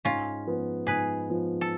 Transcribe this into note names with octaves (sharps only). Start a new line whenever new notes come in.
G#2 C#4 F4
F3 B3
G#2 G#4 B4
F3 B3
A4